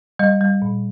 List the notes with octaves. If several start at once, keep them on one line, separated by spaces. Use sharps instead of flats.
G3 D#5
G3
A#2